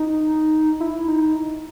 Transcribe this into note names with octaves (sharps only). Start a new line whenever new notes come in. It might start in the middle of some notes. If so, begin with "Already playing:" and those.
Already playing: D#4
E4
D#4